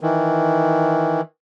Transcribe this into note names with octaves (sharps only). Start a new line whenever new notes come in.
D#3 E3